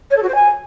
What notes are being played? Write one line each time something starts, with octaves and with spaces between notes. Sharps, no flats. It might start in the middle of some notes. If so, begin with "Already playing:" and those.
C#5
A4
F#4
C5
G#5